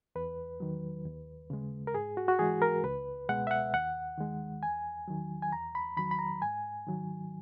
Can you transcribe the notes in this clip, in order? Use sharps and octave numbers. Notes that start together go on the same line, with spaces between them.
E2 B4
D#3 F#3
D#2
C#3 G#3
A#4
G#2 G#4
F#4
F#4
E3 G#3 G#4
A#4
C#2 B4
B2 G#3 F#5
E5
F#5
D#2 F#5
D#3 G#3
E2 G#5
D#3 F#3
G#5
E2 A#5
B5
D#3 F#3 B5
B5
A#5
G#2 G#5
D#3 F#3